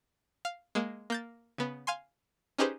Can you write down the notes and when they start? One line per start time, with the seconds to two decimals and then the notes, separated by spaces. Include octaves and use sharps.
0.45 F5
0.75 G#3 A#3
1.10 A#3 G6 A6
1.58 C#3 B3
1.87 F5 G#5 C6
2.58 C#4 D#4 G4 G#4 B4 C5